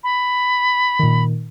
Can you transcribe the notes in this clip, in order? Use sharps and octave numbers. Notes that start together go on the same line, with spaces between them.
B5
A#2 D#3